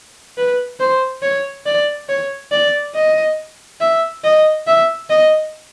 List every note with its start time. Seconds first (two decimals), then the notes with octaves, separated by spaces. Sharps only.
0.38 B4
0.80 C5
1.23 C#5
1.66 D5
2.09 C#5
2.52 D5
2.95 D#5
3.81 E5
4.24 D#5
4.67 E5
5.10 D#5